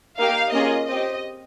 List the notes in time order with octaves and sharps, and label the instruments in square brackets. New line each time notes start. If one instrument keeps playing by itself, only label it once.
[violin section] A#3 D#4 G4 F5
A#3 C#4 F4 G#4 D#5
C4 G4 D#5